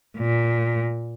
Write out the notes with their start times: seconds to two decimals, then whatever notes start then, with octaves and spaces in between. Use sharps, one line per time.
0.18 A#2